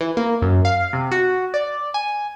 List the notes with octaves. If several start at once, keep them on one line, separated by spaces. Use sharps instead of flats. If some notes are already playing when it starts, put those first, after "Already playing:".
E3
A#3
F#2
F5
C3
F#4
D5
G#5